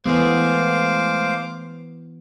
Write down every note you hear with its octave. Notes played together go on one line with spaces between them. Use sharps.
E3 G#3 A3 B3 G#4 C5 F5 D6